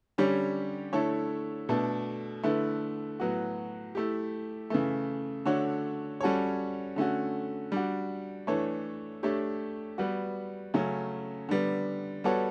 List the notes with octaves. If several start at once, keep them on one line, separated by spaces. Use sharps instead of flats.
D3 G3 C#4 G4 C#5
D3 A3 E4 A4 C#5
B2 A3 D4 A4
D3 A3 E4 B4
A2 F#3 B3 F#4
A3 E4 G4
C#3 E3 A3
D3 A3 D4 F#4 C#5
G3 C#4 F#4 A4 C#5
D3 A3 C#4 F#4
G3 D4 F#4
E3 A3 D4 A4 C#5
A3 D4 G4 C#5
G3 B3 F#4 B4
C#3 F#3 A3 C#4
D3 G3 B3
G3 B3 F#4 A4 C#5